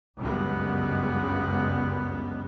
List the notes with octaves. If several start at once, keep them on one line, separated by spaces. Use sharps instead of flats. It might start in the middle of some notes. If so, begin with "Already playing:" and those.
G1 C#2 F#2 G3 G#3 B3